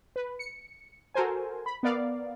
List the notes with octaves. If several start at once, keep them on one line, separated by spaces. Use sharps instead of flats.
B4
C#7
F#4 A4 A#4 C5 G#5
B5
B3 A#4 D5 F5